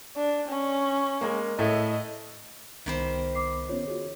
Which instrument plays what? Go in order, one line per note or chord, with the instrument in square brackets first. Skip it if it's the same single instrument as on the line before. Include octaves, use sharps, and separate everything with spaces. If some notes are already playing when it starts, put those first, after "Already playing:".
[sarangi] D4
C#4
[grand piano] G#3 A#3
[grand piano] A2 A3 [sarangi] D#5
[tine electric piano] C2 B3 B5 [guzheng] D#3 G4 C5
[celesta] D6 C7
[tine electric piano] B3 C#4 F4 [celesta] C#5
[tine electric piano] F4 F#4 G#4